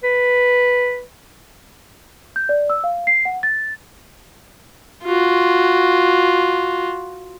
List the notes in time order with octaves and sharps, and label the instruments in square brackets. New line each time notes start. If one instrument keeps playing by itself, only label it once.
[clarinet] B4
[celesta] G6
D5
E6
F5
C7
F#5
A6
[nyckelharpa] F4 F#4